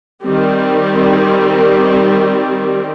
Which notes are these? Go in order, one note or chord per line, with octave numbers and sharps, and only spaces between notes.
D#3 G3 C4